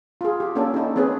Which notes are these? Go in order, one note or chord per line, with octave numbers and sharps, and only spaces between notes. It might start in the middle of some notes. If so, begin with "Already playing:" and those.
F4 G#4
G4
A#3 C#4 D4 G4 A4
D#4 E4
C4 C#4 G#4 B4